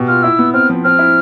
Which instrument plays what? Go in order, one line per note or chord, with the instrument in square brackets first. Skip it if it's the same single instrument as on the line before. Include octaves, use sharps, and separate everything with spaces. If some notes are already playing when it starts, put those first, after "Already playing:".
Already playing: [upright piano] B2 G4
[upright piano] F4 [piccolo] F6
[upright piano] E4 [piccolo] E6
[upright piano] B3
[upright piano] C4 [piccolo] F6
[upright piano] F3
[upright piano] C4 [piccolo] F6
[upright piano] E4